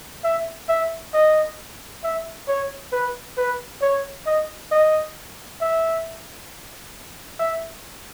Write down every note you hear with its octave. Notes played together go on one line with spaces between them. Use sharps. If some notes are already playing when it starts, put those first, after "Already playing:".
E5
E5
D#5
E5
C#5
B4
B4
C#5
D#5
D#5
E5
E5